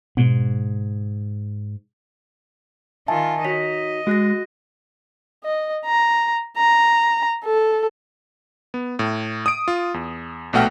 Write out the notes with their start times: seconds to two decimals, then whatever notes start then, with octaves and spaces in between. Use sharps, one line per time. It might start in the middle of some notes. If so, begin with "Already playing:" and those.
0.17 G#2 B2
3.08 D#3 F4 E5 G#5 A5
3.45 D#4 F#4 C#5 D#5 B6
4.07 G#3 F#4 G#4 F#6 A#6
5.44 D#5
5.85 A#5
6.57 A#5
7.45 A4
8.74 B3
8.99 A2
9.46 D#6 D7
9.68 F4
9.94 E2
10.53 A#1 B2 A3 F#5 G5 F6